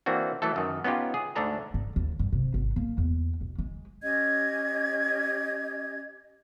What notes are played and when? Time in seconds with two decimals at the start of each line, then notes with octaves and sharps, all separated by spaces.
0.06 E3 A#3 C4 D4 F#4
0.42 E3 F#3 A3 A4
0.56 F#2 D#3
0.84 B3 C#4 D#4 F4 G4
1.14 G#4
1.36 D2 G#2 D3 D4 A4 A#5
1.74 G#2
1.96 D#2
2.19 G2
2.32 C3
2.54 G#1
2.76 A#3
2.98 E2
3.41 B2
3.59 G#3
4.02 C#4 G4 D#5 G#6